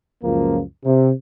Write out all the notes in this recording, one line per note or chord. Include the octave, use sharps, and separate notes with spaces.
C#2 F#2 F3 A#3
C3